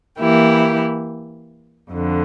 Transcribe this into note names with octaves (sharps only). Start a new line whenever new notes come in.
E3 A#3 E4 G4
F2 D3